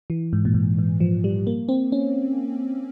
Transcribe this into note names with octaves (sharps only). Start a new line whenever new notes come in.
E3
G#2
A#2
G#2
G#2
F3
G3
A#3
C4
C#4